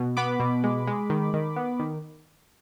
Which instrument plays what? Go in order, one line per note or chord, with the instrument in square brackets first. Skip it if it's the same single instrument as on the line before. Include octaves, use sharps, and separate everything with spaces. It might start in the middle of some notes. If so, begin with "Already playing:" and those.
Already playing: [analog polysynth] B2
B3 B5 D6
B2
G#3
G#3
D#3
D#3
B3
D#3